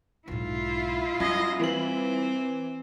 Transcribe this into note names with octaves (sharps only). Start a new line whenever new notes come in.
B1 G#2 E4 F4
F#2 G3 D#5 G#6 A#6
E3 C4 F#7